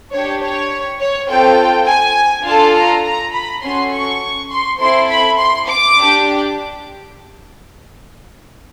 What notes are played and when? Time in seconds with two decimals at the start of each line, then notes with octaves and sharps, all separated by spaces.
0.12 D4 G4 C#5
0.42 C#5
1.00 C#5
1.29 C4 F4 A4 G5
1.88 G#5
2.46 D4 F4 A4 A5
2.76 A#5
3.05 A#5
3.34 B5
3.63 C#4 F#4 A4 C6
3.93 C#6
4.51 C6
4.80 C4 E4 A4 C6
5.10 B5
5.38 C6
5.68 D6
5.97 D4 G4